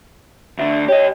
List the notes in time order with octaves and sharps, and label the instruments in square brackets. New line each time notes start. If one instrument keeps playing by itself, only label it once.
[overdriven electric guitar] D2 D3 [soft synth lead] E5
[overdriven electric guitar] G4 D#5 [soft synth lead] C#5